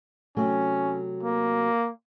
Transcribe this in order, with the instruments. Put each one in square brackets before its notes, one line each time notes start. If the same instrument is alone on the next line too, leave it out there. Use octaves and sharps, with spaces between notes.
[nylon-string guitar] C3 F#3 A3 [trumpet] C#4
[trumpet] A#3